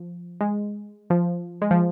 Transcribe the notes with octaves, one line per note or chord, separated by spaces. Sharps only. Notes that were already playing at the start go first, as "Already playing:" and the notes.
Already playing: F3
G#3
F3
G#3
F3